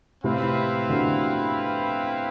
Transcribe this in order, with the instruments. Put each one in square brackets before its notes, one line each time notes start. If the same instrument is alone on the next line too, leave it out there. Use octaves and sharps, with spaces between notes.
[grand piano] A2 C3 [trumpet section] C4 E4 B4 F5
[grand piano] B2 D3